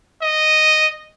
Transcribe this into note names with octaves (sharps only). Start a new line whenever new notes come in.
D#5